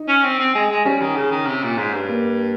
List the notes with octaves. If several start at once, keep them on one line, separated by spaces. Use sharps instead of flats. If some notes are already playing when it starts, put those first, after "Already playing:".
Already playing: D#4
C#4
C4
C4
G#3
G#3
G3 C#4
D#3
C#3
D#3
C3
A#2
G#2
G2
A#3